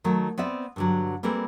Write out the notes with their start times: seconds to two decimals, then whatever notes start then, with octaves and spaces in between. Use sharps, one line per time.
0.04 D#3 F#3 A3
0.38 B3 C4 D5 E5
0.76 G2 D3 F#3
1.23 G3 A#3 C4 G#4 A4 B4